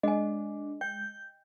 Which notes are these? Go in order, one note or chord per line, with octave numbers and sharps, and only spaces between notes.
G#3 D4 D#5 G#5
G5 G6